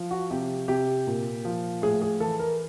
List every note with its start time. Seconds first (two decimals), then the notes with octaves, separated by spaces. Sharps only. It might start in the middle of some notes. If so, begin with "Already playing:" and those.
Already playing: F3
0.11 F#4
0.30 C3 G4
0.68 C3 G4
1.07 A#2
1.45 F3
1.82 A2 G#4
2.02 G#4
2.20 E3 A4
2.39 A#4